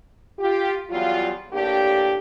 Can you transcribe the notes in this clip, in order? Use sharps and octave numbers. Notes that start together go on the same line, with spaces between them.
F4 G4
E2 F#3 G3 F4
A2 A#3 D4 G4